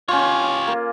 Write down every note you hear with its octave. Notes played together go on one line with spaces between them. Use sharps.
C#4 F4 G4 C#5
A#3